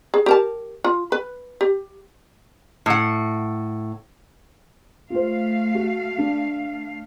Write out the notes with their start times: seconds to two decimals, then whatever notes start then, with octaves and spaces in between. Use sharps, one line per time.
0.14 G#4
0.26 G4 A#4 A5
0.84 F4
1.12 B4
1.61 G4
2.86 A2 F#5
5.10 A3 F4 C5 F5
5.75 F#4
6.18 D4